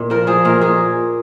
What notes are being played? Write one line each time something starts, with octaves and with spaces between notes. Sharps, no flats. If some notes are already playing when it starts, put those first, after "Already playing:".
Already playing: A#2
F3 A#4
F3 G#4
A#2 A#4
A#2 G#4